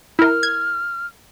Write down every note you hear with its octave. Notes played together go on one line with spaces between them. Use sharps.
E4 A#4 F6
G#6